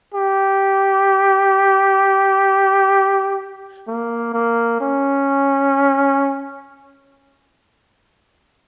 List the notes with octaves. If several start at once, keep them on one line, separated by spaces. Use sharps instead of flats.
G4
A#3
A#3
C#4